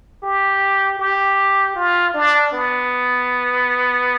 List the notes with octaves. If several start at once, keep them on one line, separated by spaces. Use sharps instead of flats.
G4
G4
F4
D4
B3